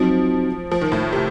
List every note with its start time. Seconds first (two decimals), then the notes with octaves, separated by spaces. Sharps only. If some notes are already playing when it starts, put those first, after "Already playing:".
Already playing: F3 F#3 C4 D#4
0.71 F3
0.81 D#3
0.92 A2
1.13 C3